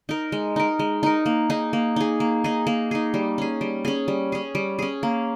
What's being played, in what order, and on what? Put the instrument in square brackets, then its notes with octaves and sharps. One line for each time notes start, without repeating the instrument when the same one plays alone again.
[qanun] D#4 A#4
G#3
D#4 A#4
G#3
D#4 A#4
A#3
D#4 G#4
A#3
D#4 G#4
A#3
D#4 G#4
A#3
D#4 G#4
G3
C#4 G#4
G3
C#4 G#4
G3
C#4 G#4
G3
C#4 G#4
A#3